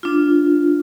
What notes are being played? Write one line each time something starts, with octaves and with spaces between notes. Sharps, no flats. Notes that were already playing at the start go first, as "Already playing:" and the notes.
D4 F4